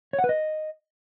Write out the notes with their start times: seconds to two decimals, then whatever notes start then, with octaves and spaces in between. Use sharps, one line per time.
0.13 C#5
0.19 F#5
0.24 B4
0.29 D#5